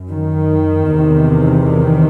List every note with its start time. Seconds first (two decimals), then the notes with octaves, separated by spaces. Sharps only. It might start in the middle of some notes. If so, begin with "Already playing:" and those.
Already playing: F#2
0.10 D#3
0.89 E2 C3
1.67 D#3